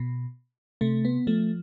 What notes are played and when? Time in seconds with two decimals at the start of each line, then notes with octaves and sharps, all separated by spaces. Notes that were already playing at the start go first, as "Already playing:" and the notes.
Already playing: B2
0.81 C3 A3
1.05 B3
1.27 F3 A3